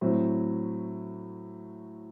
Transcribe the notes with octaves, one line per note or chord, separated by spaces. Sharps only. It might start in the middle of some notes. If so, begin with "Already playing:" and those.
A2 F#3 C4